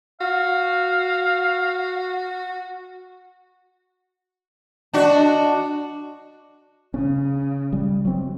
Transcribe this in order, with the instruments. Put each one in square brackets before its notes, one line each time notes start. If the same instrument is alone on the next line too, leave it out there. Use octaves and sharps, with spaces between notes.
[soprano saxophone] F#4 [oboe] F5
[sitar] D4 F#4 [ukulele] D5 D#5
[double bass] C#3 [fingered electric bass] C#4
[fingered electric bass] G3
F#3 C4